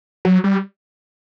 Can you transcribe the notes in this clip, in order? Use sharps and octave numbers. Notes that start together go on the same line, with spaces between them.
F#3
G3